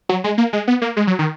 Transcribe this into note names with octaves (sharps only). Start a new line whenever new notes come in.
F#3
G#3
A#3
G#3
B3
A#3
G#3
F#3
D#3